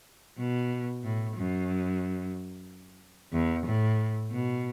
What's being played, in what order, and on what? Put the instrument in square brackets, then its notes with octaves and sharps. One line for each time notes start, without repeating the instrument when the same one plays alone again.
[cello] B2
A2
F#2
E2
A2
B2